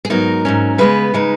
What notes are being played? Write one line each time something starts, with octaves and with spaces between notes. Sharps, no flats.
G#4
G#2 F#3 B3 D#4 A#4
G#2 F#3 C#4
C#3 G#3 B3 B4
C#3 G#3 D#4